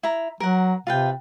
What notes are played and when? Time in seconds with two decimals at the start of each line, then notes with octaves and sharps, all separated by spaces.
0.03 E4 A#5
0.40 F#3 A#4 F#5
0.87 C3 F4 B4 G5